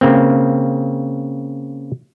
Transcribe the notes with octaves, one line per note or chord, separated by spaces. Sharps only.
C#3 A#3 C4